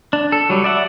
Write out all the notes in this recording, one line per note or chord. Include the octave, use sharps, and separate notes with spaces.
D4
A4
F#3 G3
D5 E5 F#5